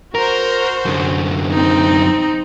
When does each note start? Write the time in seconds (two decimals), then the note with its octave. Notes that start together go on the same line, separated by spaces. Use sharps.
0.15 F#4 A#4 C5
0.85 F#2 D3
1.51 C4 D#4